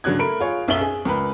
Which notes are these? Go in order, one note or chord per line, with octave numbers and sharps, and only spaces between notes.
G2 C#3 F#3 D4 F#6 G#6
A3 A#4 B5 D7
F4 G#4 C#5
B1 F#2 C#4 E5 F#7 G7
G#4
C#2 A#4 B4 B5